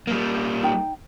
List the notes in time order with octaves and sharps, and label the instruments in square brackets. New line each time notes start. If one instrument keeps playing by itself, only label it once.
[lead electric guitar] G3 A#3
[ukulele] D#4 G5